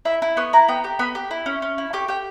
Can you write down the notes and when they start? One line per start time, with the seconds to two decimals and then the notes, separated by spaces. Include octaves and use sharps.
0.05 E4 E5
0.22 E4
0.37 B3 C#6
0.53 E4 A#5
0.68 B3 G5
0.84 G4
0.99 B3 B5
1.15 G4
1.31 E4
1.46 C#4
1.62 C#4
1.78 E4
1.93 G4 C#6
2.08 G4 G5